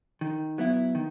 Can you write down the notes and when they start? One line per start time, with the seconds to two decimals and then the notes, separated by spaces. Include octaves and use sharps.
0.21 D#3
0.58 F#3 B3 E4
0.95 D#3